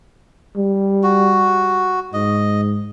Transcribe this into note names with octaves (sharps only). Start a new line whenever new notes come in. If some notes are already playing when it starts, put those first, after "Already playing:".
G3
F#4
G#2 D#5